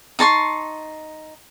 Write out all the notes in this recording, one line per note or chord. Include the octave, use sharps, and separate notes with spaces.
D#4 A5 C6 C#6